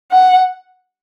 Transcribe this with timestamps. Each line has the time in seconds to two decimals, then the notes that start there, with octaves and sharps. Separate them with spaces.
0.11 F#5